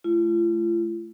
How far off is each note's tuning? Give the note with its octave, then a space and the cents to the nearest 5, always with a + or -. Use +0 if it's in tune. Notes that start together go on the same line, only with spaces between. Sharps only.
A3 -25 F4 -40